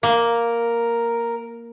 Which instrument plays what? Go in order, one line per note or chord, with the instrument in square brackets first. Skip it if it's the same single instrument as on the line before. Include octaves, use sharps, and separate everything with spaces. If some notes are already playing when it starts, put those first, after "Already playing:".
[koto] A#3 [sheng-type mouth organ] A#4